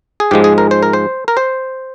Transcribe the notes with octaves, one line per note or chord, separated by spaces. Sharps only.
G#4
G#2 F3 G#3 G4
G#4
A#4
C5
A#4
C5
A#4
C5